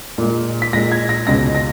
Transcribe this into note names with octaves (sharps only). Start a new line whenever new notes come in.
A#2 G#3
B6
A#2 G#3 A#6
G#6
A#6
C#2 B2 G#3 A#6
A#6